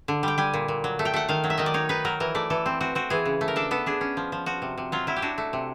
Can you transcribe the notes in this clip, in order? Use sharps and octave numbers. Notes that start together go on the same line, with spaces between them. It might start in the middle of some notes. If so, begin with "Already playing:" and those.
D3
G3 G5
G3 G#5
A#2
A#2
F#3
A3
G5
A3 F#5
D#3 F5
F#3
E5
D#3 D#5
D5
D#4 C#5
D#4 B4
F#3 A#4
E3 A#4
A3 D5
E3 A4
C4
C4 F#4
C4 F#4
E3 G#4
C#3
A3
A#4
D4 A4
B3 A4
D4 G#4
C#4
F3
F3
F3 F#4
C3
C3
F#3 F4
F#3 E4
G4
D4 F#4
A3
C3